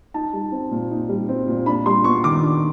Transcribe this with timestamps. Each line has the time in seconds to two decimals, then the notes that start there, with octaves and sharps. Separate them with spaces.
0.14 D#4 A5
0.33 G3
0.52 C4
0.71 A#2
0.91 D#4
1.09 G3
1.29 C4
1.47 A#2
1.66 D4 B5
1.86 G3 C6
2.04 B3 C#6
2.24 D#3 D6
2.43 D4